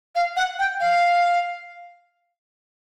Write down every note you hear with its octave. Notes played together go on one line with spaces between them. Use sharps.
F5
F#5
G5
F5